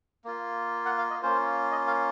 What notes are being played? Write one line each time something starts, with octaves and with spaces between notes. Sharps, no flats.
A#3 F4
F#5
F5
D#5
A#3 C#4 F4 C5
D#5
F5